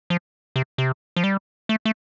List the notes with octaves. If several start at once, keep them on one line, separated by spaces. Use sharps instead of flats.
F3
C3
C3
F3
G3
A3
A3